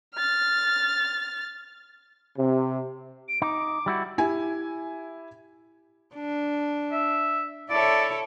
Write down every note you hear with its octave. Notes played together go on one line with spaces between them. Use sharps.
F6 A6
C3
D7
D#4 D6
G3 E4 F#4
E4 G4 G#5
D4
E5
E4 A4 C#5 D5